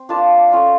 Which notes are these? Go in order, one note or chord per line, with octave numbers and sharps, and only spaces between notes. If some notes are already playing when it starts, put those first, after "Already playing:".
Already playing: C4
F3 A#3 D4 F4 A5
A3 C#4 F4